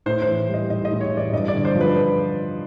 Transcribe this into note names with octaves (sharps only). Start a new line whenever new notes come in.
A2 C5
C5
E3
G3 D#5
A2 D#5
D#5
A2
C#5
E3 D5
G2 D#5
D5
D3
C5
F3
B4
B4